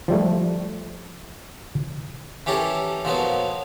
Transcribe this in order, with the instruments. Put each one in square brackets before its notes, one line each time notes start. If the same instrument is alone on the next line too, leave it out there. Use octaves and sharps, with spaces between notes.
[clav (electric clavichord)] F3 G3 A3
[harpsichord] E3 C#4 G4 A4 A#4
A#2 F3 F#3 B3